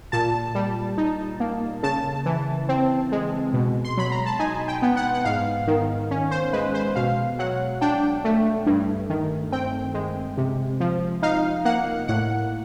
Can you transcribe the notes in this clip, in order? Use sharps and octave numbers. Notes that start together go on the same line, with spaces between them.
A#2 A5
G3
D#4
A#3
C#3 A5
E3
C4
G#3
B2
C6
F#3 B5
A#5
A5
D#4 G#5
G5
B3
F#5
F#5
G#2 F5
D#3
C#4
C5
G#3 B4
C5
B2 F5
F#3 F#5
D4 G5
A3
G2
D#3
C4 G5
G#3
C3
F3
D#4 F5
A#3 F#5
A2 F#5